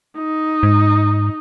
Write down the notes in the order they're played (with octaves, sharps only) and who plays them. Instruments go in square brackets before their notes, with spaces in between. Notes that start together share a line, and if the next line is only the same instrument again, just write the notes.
[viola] D#4
[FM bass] G#2